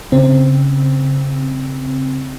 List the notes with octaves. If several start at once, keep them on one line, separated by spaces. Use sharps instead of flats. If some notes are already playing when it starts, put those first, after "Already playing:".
C#3 C4